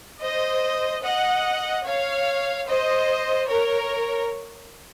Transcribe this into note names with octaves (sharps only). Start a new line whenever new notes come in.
C5 D#5
D#5 F#5
C#5 F5
C5 D#5
A#4 C#5